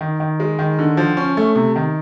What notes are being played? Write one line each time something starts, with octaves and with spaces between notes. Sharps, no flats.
D#3
D#3
G#3
D#3
D3
F3
C#4
A3
C3
D#3